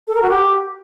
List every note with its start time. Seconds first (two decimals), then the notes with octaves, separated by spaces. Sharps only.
0.07 A4
0.15 A#4
0.22 F#4
0.30 G4